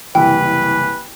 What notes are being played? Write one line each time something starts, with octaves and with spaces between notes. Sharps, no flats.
F#1 C2 E3 B4 G5